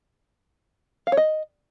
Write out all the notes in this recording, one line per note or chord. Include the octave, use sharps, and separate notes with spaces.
F5
C#5
D#5